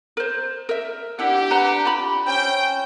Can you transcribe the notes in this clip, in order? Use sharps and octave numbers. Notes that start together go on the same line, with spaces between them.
A#4 C5
A#4 E5
D4 E4 G4 F#5
B4 F#5 A#5
F4 B5
C4 C#4 G5